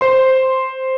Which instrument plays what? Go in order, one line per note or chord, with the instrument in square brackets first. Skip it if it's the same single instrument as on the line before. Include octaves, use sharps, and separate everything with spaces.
[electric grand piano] C5 C6